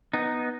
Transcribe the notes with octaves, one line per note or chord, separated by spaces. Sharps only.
B3 D#4